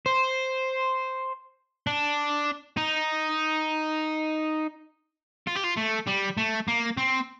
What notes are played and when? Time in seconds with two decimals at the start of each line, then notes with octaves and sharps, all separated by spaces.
0.06 C5
1.87 D4
2.77 D#4
5.47 F4
5.56 G4
5.64 F4
5.77 A3
6.07 G3
6.38 A3
6.68 A#3
6.97 C4